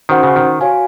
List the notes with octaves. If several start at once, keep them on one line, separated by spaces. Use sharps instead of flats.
D#3 C#4 F#4 C5 F#5
C#3
D#3
F#4 C#5 F5 G#5